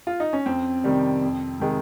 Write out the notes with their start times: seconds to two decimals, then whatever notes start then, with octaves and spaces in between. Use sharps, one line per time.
0.07 F4
0.20 D#4
0.33 C#4
0.46 F2 C4
0.84 C3 D#3 G3
1.22 F2
1.60 C3 D#3 G#3